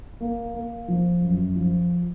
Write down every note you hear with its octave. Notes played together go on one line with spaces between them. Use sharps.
A#3
A#3
F3
F#2
F3